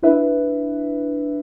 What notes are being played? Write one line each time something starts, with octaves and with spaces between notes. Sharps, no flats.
D4 E4 B4 E5